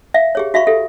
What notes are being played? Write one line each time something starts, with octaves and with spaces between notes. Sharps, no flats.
E5 F5
G4 G#4 C#5
F#4 E5 F5 B5 C#6
G4 A4 E5